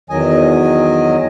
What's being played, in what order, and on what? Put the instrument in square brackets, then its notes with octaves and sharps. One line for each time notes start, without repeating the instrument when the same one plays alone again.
[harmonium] E2 D#3 F#3 D#5 G#5